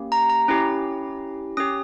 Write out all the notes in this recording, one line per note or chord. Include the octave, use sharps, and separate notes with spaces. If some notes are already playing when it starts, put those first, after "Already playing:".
Already playing: A#3 C#4 G4
A#5
A#5
C#4 E4 G4
C#4 G4 D#6